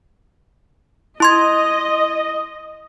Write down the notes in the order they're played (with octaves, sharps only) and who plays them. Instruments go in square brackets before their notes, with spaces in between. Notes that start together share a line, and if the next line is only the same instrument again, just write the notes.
[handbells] E4 C6 G#6 [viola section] D#5